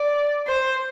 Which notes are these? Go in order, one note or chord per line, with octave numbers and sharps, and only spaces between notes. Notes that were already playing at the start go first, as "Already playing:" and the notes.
Already playing: D5
C5